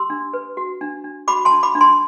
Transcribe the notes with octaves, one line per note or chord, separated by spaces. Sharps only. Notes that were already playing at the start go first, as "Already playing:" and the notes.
Already playing: G4 C6 E6
D4
B4
F#4
D4
D4
F#4 B5 D6
A5 C6
D4
B5 D6
D4
A5 C6